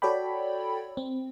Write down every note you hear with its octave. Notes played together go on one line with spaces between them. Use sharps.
F#4 A4 C#5 D5 G5 B5
C4